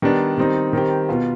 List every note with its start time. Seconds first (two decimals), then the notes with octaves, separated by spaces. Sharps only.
0.02 D#3 G3 B3 D4
0.38 D#3 G3 C4 D#4
0.73 D#3 G3 C4 G4
1.09 B2 B3 F4